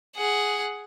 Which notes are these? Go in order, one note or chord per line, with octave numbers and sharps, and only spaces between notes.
G#4 F#5